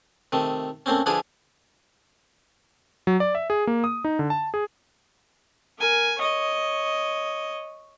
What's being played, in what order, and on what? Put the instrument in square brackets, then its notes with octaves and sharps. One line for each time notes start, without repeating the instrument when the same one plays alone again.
[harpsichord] C3 D#3 A3
A3 A#3 C4 C#4
D3 F3 D4 E4 G#4 B4
[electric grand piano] F#3
D5
E5
G#4
A#3
D#6
D#4
D3
A5
G#4
[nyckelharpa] A#4 G#5
C#5 D#5